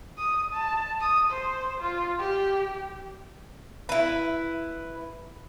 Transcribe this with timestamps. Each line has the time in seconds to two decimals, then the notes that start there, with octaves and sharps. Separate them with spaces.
0.18 D#6
0.53 A5
1.01 D#6
1.31 C5
1.81 F4
2.19 G4
3.89 E4 B4